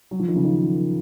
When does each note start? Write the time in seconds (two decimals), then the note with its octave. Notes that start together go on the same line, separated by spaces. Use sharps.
0.11 F#3
0.20 F3
0.28 D#3
0.36 C#3
0.44 D#3